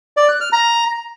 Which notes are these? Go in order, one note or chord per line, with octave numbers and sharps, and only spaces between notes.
D5
F#6
F6
A#5